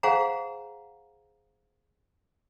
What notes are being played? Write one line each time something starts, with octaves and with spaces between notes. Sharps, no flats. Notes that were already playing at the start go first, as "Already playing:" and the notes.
G#4 C5 F5 F#5 G#5 A#5